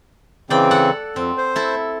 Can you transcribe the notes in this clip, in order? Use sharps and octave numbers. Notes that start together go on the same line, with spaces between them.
C#3 E3 C4 D5 G5
A4 F#5
F2 C4
C5
E4 A4